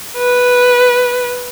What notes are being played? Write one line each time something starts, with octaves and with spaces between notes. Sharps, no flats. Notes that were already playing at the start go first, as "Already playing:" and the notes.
B4